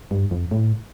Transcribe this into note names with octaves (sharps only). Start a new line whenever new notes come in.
G2
F2
A2